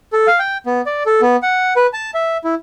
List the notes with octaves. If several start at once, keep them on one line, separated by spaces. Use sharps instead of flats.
A4
F5
G5
B3
D5
A4
B3
F#5
B4
A5
E5
E4